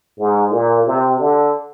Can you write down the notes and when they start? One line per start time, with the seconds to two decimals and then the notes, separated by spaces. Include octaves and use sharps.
0.19 G#2
0.52 A#2
0.86 C3
1.20 D3